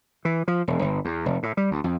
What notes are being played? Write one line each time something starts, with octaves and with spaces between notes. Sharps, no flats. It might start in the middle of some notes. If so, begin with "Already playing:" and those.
E3
F3
E1
G1
E2
F1
A2
G3
D2
F2